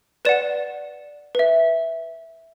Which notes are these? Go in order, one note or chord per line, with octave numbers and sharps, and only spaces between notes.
B4 D5 F#5 E7
B4 E5